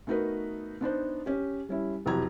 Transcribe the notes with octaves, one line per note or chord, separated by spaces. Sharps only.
A3 B3 D#4 F#4 A#4 B4
B3 D4 D#4 C5
C#4 G4
G3 C#4 E4
F1 B1 E2 G4 A#5 G#6